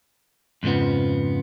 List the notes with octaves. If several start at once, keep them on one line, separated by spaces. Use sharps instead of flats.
F2 G#2 C#3 F3 B3